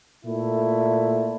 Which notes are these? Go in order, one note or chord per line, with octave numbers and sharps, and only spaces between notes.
A#2 A3 E4